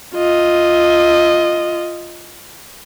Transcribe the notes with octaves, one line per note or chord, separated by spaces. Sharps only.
F4 D#5